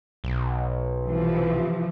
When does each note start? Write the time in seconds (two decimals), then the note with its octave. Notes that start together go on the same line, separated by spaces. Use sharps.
0.24 B1
1.05 C3 E3 F3